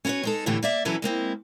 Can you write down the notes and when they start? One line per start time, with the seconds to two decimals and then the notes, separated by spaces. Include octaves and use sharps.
0.05 C#4 E4 F#4 B4 C#5
0.24 G#3 D#4 A4
0.46 A2 D3 E3 A3 G4
0.63 A#3 D5 E5
0.85 E3 F#3 C#4 E4 A4 B4
1.02 G#3 A#3 C4 E4